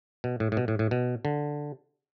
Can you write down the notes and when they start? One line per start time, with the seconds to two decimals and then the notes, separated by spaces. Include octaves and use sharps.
0.24 B2
0.40 A2
0.52 A2
0.57 B2
0.68 A2
0.79 A2
0.91 B2
1.25 D3